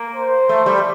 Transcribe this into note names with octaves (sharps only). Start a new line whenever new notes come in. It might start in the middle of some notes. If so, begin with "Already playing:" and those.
Already playing: A#3
C5
A3
G3